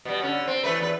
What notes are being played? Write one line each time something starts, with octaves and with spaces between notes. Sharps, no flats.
B2 G3
D3 C#4
C4
E3 A3 B4
E2 B4